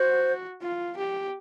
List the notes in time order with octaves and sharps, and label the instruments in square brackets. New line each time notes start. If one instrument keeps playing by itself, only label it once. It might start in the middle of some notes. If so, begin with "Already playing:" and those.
Already playing: [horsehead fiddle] F#4 [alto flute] C5
[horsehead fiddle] F4
G4